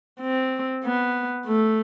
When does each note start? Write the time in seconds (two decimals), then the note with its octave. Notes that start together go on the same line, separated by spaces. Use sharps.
0.21 C4
0.84 B3
1.46 A3